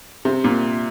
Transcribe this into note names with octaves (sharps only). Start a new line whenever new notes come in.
C3
A#2